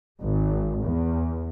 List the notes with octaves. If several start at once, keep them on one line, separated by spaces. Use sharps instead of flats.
G#1
E2